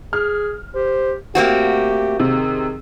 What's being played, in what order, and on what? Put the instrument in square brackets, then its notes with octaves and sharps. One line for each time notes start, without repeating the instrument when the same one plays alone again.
[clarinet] G#4 [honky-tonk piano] F6
[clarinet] G4 [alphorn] C5
[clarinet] A3 [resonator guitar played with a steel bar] A#3 C4 F#4 [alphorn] G4
[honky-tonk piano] C3 [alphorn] D#3 [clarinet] G#4